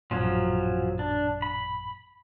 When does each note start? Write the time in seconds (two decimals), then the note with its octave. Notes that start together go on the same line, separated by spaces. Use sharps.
0.11 A1 F#2 A#2 F3 F#3 C#4
0.99 D4
1.42 B5